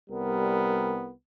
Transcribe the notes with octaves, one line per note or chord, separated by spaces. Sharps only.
C2 G3 B3 A#4